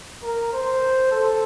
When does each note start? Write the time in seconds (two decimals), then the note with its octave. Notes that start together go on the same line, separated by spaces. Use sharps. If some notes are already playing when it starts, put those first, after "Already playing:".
0.23 A#4
0.53 C5
1.12 A4